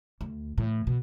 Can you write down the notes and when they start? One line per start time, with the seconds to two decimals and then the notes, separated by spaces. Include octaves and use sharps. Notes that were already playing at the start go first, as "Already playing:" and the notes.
0.21 D2
0.58 A2 E3
0.87 B2